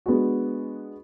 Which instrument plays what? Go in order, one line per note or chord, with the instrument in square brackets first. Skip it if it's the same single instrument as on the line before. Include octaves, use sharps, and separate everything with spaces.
[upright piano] G#3 B3 D4 F#4